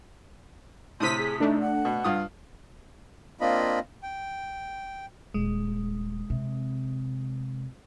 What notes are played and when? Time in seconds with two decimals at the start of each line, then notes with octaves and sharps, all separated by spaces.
1.00 A2 C3 C6 D#6 B6
1.18 G#4
1.40 A3 D4 D#4
1.61 F#5
1.85 B2
2.04 G2 F4 D#6
3.41 A#3 C4 D4 F4 D#5 B5
4.03 G5
5.34 D#1 G#3
6.30 C3